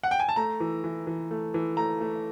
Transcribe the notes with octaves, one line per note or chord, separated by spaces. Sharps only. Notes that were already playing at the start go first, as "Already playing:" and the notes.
F#5
G5
G#5
A5
A3 A#5
E3
E3
E3
A3
E3
A3 A#5
A3